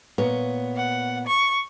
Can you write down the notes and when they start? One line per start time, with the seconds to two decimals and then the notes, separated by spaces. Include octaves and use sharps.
0.18 A#2 B3 C#5
0.76 F#5
1.27 C#6